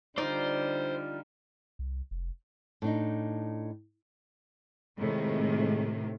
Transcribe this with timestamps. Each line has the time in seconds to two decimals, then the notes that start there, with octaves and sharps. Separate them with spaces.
0.18 D3 G3 D#4 F4 C5 D5
1.79 C2
2.11 F1
2.82 A2 D4 D#4
4.99 A2 C3 D#3 G#3